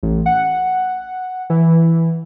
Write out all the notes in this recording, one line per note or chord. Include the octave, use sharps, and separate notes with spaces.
A1
F#5
E3